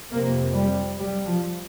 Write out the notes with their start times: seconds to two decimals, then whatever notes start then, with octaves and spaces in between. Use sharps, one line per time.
0.11 F2 C3 A#3
0.54 G3
0.98 G3
1.26 F3